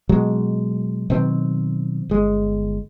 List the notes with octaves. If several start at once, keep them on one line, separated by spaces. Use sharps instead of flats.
B2 F#3 G#3
B2 D#3 F#3 C4
G1 G#3